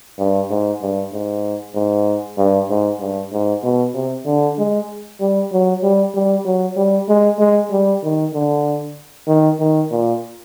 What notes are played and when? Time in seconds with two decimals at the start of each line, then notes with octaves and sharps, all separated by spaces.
0.19 G2
0.50 G#2
0.82 G2
1.13 G#2
1.75 G#2
2.38 G2
2.70 G#2
3.01 G2
3.32 G#2
3.64 B2
3.95 C3
4.26 D3
4.58 G#3
5.21 G3
5.52 F#3
5.83 G3
6.14 G3
6.45 F#3
6.77 G3
7.09 G#3
7.39 G#3
7.71 G3
8.03 D#3
8.34 D3
9.28 D#3
9.60 D#3
9.91 A#2